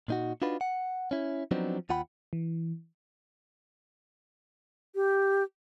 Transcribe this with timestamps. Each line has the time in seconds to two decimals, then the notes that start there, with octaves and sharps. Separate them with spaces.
0.08 A#2 D#4 F#4
0.42 D4 D#4 F4 F#4 B4
0.61 F#5
1.11 C#4 E4
1.51 F3 F#3 B3 C4 D4 D#4
1.89 D#2 F4 F#5 G5 B5
2.33 E3
4.95 G4